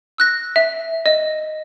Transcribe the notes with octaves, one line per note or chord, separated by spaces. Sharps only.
E6 F#6 A#6
E5
D#5